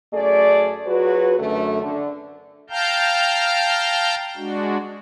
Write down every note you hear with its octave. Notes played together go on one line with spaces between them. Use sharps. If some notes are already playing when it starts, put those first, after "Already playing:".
F#2 A3 G#4 D5
F#3 F4 F#4 G#4 B4
F#2 D3 A3
D3
F5 G5 A5 A#5 F6 G6
G#3 D4 F#4